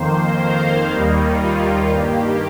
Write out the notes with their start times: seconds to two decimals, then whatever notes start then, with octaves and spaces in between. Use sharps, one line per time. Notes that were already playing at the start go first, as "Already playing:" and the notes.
Already playing: F2 D#3 A#3 C5
0.41 F5
0.91 D#2 D#3 G3 A#3 D#4
1.42 F4
1.91 G2 D#3 A#3 G4